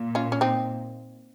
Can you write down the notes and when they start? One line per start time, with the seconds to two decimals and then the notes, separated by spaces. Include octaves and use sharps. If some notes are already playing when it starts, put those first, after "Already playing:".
Already playing: A#2
0.15 C#4 F4
0.32 C#4
0.41 C4 D#4